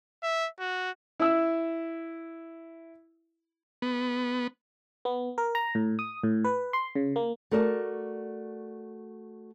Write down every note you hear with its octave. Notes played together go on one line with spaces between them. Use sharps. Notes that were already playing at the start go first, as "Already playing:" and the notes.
E5
F#4
E4 E6
B3
B3
A#4
A#5
A2
D#6
A2
B4
C6
C#3
A#3
A3 F#4 A#4 D5 A5